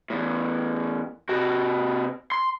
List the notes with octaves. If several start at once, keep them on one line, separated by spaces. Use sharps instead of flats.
E2 A2
C3 F#4
C6